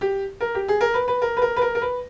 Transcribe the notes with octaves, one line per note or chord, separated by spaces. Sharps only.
G4
A#4
G4
G#4
A#4
B4
B4
A#4
B4
A#4
B4
A#4
A#4
B4